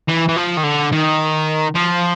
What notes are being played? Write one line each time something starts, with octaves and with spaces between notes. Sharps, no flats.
E3
E3
F3
D#3
D3
D#3
F3